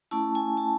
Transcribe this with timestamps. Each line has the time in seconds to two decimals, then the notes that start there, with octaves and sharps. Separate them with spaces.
0.11 A3 C#4 E4 A5
0.35 G#5
0.57 A5